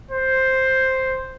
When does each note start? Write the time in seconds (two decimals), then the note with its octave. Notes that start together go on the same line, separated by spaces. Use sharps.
0.11 C5